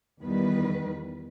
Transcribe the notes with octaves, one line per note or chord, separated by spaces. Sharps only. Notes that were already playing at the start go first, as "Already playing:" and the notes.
E2 D#3 G3 B4